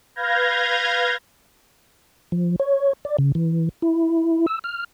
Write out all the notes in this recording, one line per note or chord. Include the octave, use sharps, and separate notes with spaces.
B4 F5 F6 G6 G#6 A#6
F3
C#5
D5
C#3
E3
E4
E6
F6